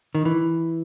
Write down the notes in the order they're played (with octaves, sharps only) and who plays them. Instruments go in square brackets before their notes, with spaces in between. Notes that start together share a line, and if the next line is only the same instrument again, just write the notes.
[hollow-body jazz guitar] D#3
E3